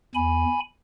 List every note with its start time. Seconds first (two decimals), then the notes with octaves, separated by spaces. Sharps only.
0.15 E2 G#5 B5